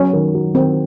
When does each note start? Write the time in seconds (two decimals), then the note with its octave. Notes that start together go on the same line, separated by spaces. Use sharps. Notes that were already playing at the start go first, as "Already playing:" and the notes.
Already playing: F#3 B3 C#4
0.13 D#3
0.34 F#3
0.55 D#3 C4